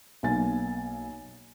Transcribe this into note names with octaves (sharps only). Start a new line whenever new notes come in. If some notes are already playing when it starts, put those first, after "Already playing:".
B1 A#3 G#5 A6